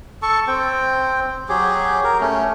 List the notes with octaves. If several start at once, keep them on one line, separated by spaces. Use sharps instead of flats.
A4 A5 C#6
C4 G5
F#3 G4 G#4
A#4
A3 C#4